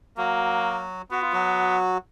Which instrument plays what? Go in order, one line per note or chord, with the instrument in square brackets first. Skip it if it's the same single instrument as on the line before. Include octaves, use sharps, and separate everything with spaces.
[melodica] F#3 F#4 [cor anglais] A#3
[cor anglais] B3 [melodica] F#4
[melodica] F4
F#3 F#4